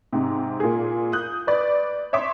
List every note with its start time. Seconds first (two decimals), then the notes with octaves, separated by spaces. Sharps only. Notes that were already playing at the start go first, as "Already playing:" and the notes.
0.13 G#2 C3
0.60 A#2 G#4
1.12 D#6 F#6 G6
1.47 B4 D5
2.13 C#5 E5 C6 D6